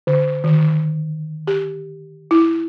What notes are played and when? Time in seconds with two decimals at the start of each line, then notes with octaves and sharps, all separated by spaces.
0.07 D3
0.44 D#3
1.47 G4
2.31 E4